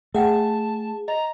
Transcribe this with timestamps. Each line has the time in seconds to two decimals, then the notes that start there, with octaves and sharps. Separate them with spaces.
0.14 A3 G#4 E5 F#5 G5 A5
1.08 D#5 A#5